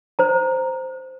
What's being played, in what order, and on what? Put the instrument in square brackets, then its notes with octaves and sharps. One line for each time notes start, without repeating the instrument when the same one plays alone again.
[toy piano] C5 A#5